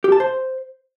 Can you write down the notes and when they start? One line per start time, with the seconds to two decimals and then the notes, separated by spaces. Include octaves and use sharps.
0.04 G4
0.12 A5
0.20 C5